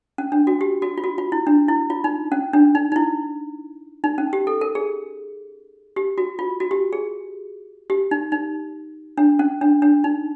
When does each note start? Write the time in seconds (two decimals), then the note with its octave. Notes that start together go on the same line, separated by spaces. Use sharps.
0.18 C#4
0.32 D4
0.47 F#4
0.61 G4
0.82 F#4
0.98 F4
1.04 F#4
1.18 F4
1.32 E4
1.47 D4
1.69 E4
1.90 F4
2.04 D#4
2.32 C#4
2.53 D4
2.75 D#4
2.92 D#4
2.96 E4
4.04 D#4
4.18 C#4
4.33 G4
4.47 A4
4.61 A#4
4.75 G#4
5.96 G4
6.18 F#4
6.39 F4
6.60 F#4
6.71 G4
6.93 G#4
7.90 G4
8.11 D#4
8.32 D#4
9.18 D4
9.39 C#4
9.61 D4
9.82 D4
10.04 D#4